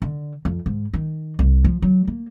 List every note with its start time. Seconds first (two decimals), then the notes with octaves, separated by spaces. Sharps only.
0.02 D3
0.45 F2
0.66 G#2
0.93 D#3
1.39 C2
1.64 F3
1.82 F#3
2.07 A#3